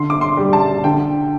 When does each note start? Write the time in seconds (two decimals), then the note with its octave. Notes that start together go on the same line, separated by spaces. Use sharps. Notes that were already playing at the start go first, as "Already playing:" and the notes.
Already playing: D3 C6
0.10 D6
0.21 C6
0.37 G3
0.53 A5
0.84 D3 G5